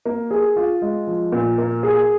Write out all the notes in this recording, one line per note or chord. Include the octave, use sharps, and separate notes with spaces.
A#3
G#4
F4
G#3
F3
A#2
A#3
G#4